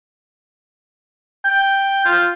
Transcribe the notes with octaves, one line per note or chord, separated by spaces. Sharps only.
G5
F4